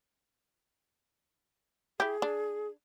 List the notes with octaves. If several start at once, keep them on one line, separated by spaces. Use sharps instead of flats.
E4 G4 G#4
D4